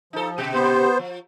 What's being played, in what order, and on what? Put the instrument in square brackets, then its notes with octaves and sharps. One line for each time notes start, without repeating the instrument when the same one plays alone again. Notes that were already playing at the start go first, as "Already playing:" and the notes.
[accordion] F3 [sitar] D#4 A4
[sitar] B2 G4
[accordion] B3 C5
[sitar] F3